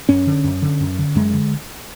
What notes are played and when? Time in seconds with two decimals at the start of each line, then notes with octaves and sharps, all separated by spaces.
0.09 F#2 C#4
0.27 D3
0.44 F#2
0.62 D3
0.80 F#2
0.99 D3
1.15 F#2 G#3
1.33 D3